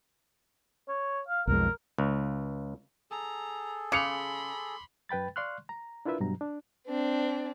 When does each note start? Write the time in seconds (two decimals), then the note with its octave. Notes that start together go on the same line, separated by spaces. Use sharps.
0.88 C#5
1.29 F5
1.47 B1 F2 G#3 A#4
1.98 C#2
3.11 G#4 A4 A#5
3.92 C#3 B5 C6 D6 C#7 F7
5.09 F#2 B4 G5 B5 A6
5.36 D5 F5 C6 C#6 F6 F#6
5.69 A#5
6.05 D4 E4 F4 A#4 B4 E5
6.20 G2 B2 F#3 A#5
6.41 D4
6.88 C4 D4